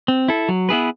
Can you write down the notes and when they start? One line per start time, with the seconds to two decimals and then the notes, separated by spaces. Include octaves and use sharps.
0.08 C4
0.28 E4 A4
0.49 F#3
0.69 B3 E4 G#4 B4